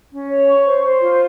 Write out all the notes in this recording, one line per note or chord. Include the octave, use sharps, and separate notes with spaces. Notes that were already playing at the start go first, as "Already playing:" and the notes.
C#4
C#5
C#6
C5
C5
F4